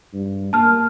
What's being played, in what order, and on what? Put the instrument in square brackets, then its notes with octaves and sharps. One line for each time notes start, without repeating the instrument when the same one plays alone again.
[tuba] G2
[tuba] A#3 [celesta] A5 F6